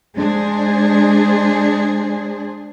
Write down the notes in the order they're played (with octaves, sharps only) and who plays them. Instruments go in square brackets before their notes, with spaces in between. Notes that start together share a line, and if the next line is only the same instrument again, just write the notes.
[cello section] G#3 D4 G#4 C5